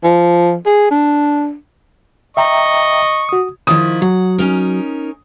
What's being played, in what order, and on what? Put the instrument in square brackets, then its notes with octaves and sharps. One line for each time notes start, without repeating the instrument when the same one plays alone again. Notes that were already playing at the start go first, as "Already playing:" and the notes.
[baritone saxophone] F3
G#4
D4
[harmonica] D#5 C#6 [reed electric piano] E5 G5 A#5
[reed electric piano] F#4 D#6
[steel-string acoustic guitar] D#3 F3 E4 [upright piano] D#6
[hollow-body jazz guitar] F#3 [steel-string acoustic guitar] F#5
[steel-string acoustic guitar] C#4 D#4 A#4